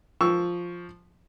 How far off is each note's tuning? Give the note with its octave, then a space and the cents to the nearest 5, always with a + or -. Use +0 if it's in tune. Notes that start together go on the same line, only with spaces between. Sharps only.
F3 +0 C#6 +10 E6 +0